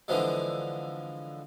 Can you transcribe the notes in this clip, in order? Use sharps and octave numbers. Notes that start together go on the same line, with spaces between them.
D3 E3 F3 G#3